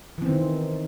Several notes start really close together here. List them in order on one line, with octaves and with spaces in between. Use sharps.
E3 C4 D#3